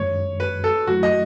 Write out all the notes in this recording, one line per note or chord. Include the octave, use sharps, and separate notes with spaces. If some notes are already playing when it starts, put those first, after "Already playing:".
Already playing: F#2 D#3 G#3 C#5
B4
A4
F#2 D#3 F#3 A3 E4 F#4
D#5